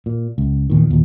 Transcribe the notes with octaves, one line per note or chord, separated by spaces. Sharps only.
A#2
C#2
E2 A#2 D#3
D#2 A#2